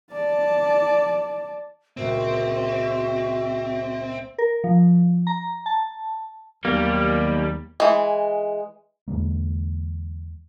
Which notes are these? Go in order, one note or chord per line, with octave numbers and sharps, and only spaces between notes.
D5 A5
C#2 A#2 C4 F#4 E5
A#4
F3
A#5
A5
D#2 F#3 G3 A#3 B3
E3 G#3
E2 D3 G#3 A#3